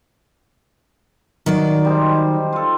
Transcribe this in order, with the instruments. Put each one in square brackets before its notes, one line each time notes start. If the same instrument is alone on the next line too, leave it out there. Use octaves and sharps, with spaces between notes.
[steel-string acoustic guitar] D#3 F#3 D5
[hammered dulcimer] G3 D#4 C5
F4 A4